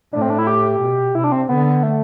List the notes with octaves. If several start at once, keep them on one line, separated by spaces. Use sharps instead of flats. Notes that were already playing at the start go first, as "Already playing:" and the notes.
A2 D4
C4
D4
E4
G4
B2
C3 E4
D4
C4
D3 B3
A3